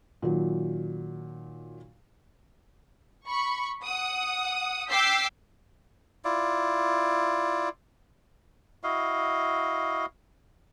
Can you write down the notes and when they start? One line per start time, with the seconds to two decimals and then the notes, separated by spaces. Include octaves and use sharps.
0.22 A#2 D#3 F#3
3.27 B5 C#6
3.85 F#5 D#6
4.90 G5 D6 E6 G6 B6 C7
6.25 E4 F4 D5
8.84 E4 F#4 D#5 F5